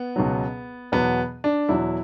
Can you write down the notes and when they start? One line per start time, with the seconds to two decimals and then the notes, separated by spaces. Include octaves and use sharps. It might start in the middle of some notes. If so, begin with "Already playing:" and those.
Already playing: B3
0.16 C#2 B2 F#3
0.92 E2 B2 F#3 B3
1.44 D4
1.69 E2 B2 F#3 E4